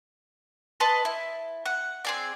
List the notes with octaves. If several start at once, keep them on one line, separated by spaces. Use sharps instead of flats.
B4 D#5 A5 C6
E4
F#5
C4 G#4 D5